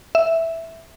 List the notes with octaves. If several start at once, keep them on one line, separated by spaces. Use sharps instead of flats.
E5